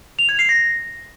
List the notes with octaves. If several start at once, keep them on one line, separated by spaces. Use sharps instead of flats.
F7
G#6
C7
A#6